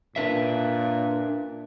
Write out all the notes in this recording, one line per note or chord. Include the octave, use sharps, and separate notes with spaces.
A#2 D4 B4 E5